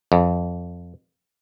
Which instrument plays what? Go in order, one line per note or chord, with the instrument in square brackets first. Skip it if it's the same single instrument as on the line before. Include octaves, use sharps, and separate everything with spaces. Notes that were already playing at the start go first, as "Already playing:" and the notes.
[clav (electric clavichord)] F2